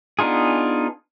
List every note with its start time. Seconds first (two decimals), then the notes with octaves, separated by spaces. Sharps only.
0.19 B3 D4 D#4 F4 G#4